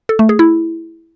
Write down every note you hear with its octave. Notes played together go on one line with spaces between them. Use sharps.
A4
A3
G#4
E4